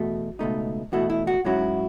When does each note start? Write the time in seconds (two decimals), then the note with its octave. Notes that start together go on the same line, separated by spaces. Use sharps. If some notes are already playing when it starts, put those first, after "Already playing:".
Already playing: E2 B2 A3 F#4
0.39 C#2 B2 A3 D#4
0.92 E2 B2 A3 E4 F#4
1.10 E4
1.27 F#4
1.45 G#2 F#3 C#4 E4 F#4